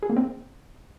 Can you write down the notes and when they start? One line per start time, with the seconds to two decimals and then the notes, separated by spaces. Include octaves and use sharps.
0.03 G#4
0.10 A#3
0.17 C4